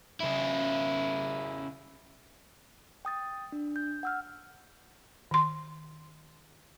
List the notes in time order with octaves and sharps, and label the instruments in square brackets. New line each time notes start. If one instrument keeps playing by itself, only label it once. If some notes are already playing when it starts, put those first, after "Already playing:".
[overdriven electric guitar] C#3 E4
[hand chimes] G5 D#6 A6
D4
G6
F#5 E6 F6
[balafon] D#3 C6